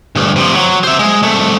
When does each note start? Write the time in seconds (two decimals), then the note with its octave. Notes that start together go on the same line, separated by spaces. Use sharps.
0.15 D2 G2
0.36 C3 F3
0.55 F#3
0.84 C5 E5
0.99 G#3
1.23 C2 A3